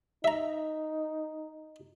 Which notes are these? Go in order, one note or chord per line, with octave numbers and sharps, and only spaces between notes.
D#4 E5 A#5